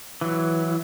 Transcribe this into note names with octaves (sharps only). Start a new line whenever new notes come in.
E3 F#3